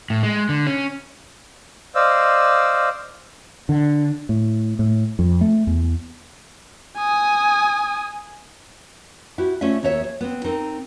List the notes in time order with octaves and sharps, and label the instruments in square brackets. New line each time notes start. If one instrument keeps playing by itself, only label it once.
[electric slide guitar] A2
G#3
D3
C#4
[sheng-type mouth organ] C5 D5 D#5 F5 E6
[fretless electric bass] D3
A2
A2
F2
A3
E2
[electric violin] G#5 D#6
[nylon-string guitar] E4 F#4 G4
A3 C#4 F4 D5 E5
D#2 A4 C#5 E5
G#4 C#5
B3 C4
C4 D#4 A4 A#4